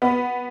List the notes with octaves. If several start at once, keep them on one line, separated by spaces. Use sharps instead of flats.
B3